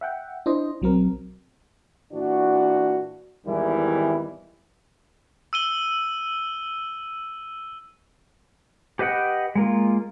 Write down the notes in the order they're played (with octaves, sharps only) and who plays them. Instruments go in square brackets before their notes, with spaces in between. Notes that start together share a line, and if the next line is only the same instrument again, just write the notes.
[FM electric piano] E5 F#5 G5
D4 E4 C5 D#5
B1 F#3 C4 A#4
[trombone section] A#2 E3 D4 F#4
G#1 E2 D#3 E3 G3 E4
[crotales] E6 D#7 G7
[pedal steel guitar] G4 B4 D#5 F#5 G5
G#3 A#3 F4